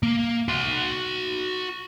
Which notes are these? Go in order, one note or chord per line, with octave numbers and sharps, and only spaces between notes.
A#3
F#4 C6